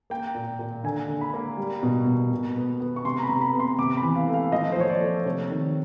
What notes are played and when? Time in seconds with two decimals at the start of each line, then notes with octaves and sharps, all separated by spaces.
0.10 A#3 G5
0.35 A#2
0.59 A#2
0.84 D3 G#5
1.08 D3
1.21 B5
1.34 A#3
1.57 G3
1.83 B2
2.06 B2
2.31 B2
2.56 B3
2.80 B3
2.96 C#6
3.05 C3 C6
3.18 A#5
3.23 B5
3.29 C3
3.41 B5
3.53 B3
3.60 C6
3.78 C3 D6
3.97 E3 B5
4.16 F5
4.28 A3
4.34 F5
4.52 F3 D#5
4.72 C5
4.76 F3 C#5
4.89 D5
5.01 A3
5.25 C3 C#5
5.50 D#3